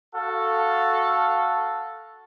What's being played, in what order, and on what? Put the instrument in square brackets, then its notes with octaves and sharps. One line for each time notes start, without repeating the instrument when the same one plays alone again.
[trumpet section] F#4 A4 F5